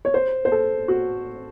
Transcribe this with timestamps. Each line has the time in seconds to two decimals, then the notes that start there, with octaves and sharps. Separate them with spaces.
0.05 C#5
0.14 C5
0.45 C5
0.52 A4
0.88 F#4